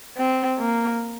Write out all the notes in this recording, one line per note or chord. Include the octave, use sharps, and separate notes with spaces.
C4
A#3